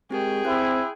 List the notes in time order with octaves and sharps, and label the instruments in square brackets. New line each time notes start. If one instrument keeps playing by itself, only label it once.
[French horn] G#3 [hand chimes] C4 G4 A#4 [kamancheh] G#4 G5
[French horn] C4 [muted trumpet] E4 [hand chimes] C6 F#6